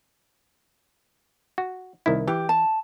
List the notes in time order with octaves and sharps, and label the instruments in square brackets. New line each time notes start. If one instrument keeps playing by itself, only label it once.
[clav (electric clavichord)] F#4
C2 D#3 E4
[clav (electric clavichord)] E3 [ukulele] G4
[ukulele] A5